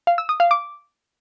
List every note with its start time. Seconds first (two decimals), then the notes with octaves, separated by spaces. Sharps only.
0.07 F5
0.18 E6
0.29 D#6
0.40 F5
0.51 D6